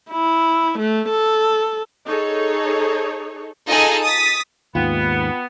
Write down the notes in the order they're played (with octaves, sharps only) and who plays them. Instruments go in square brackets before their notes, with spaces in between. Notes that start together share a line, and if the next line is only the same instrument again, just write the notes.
[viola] E4
A3
A4
[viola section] D#4 G#4 A4 C#5
[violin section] D#4 F4 G#4 A4 D#5 G#5
D#6 A6 B6
[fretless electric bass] D#2 G#2 [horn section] B3 [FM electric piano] F4 G5